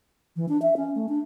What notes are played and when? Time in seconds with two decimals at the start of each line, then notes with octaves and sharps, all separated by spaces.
0.36 E3
0.49 D4
0.62 E5
0.77 C#4
0.95 A3
1.09 D4